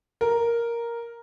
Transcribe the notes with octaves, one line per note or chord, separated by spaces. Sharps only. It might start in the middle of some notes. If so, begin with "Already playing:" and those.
A#4